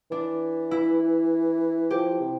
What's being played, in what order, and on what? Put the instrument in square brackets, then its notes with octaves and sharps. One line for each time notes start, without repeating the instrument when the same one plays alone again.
[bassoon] E3 [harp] D4
[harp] E4
[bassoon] F3 [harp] G4
[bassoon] C3